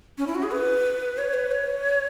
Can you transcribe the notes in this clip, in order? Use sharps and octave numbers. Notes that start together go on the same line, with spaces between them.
C#4
E4
F#4
G#4
B4
C#5
B4
C#5